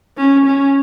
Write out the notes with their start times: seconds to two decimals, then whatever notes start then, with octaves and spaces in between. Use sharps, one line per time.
0.17 C#4
0.46 C#4